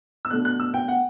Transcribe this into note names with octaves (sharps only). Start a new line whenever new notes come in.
E6
B2 A3 D4 F#6
F#6
E6
G5
F#5